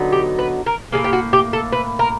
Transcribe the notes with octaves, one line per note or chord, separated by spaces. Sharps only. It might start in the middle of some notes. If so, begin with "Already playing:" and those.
Already playing: D3 F#3 B3 D#4
G4
B4
A#4
A2 F#3 A#3 G#4
G4
F#4
G4
A4
B4
A#4